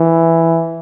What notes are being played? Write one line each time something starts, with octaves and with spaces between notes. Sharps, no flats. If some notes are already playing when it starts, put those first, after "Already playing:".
Already playing: E3